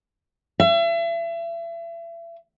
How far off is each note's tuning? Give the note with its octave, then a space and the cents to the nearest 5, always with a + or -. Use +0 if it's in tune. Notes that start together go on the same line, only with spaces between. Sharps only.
E5 +35